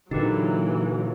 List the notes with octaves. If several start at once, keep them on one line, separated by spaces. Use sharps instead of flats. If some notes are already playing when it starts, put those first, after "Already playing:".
A#2 D3 E3 F#3 D#4 G4 B4